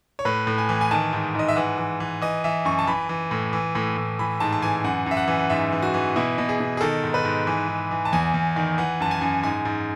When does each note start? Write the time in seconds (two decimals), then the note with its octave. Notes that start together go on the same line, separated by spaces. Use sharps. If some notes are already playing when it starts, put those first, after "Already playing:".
0.19 C#5
0.25 A2 B4
0.47 A2
0.58 G#5
0.69 E3
0.81 G#5
0.91 D#3 A5
1.13 G#2
1.35 G#2 D#5
1.48 E5
1.56 E3 F#5
1.78 E3
2.00 E3
2.22 E3 D#5
2.44 E3 E5
2.65 F#2 C#6
2.79 A5
2.87 E3 B5
3.09 E3
3.31 A2
3.53 E3
3.75 A2
3.97 A2
4.19 E3 B5
4.40 G#2 A5
4.53 A5
4.62 E3 G#5
4.84 F#2 F#5
5.06 F#2 E5
5.17 F#5
5.28 E3
5.39 F#5
5.50 G#2 E5
5.72 E3
5.82 F#4
5.94 E3
6.16 B2 E4
6.38 B2
6.49 G#4
6.60 B2
6.77 G#4
6.81 D#3 A4
7.04 G#2
7.14 B4
7.25 G#2
7.47 E3
7.68 G#2
7.91 E3
8.05 A5
8.13 E2 G#5
8.34 E2
8.56 D#3
8.78 E3 F#5
9.00 F#2 A5
9.11 G#5
9.21 F#2
9.43 G#2 G#5
9.65 G#2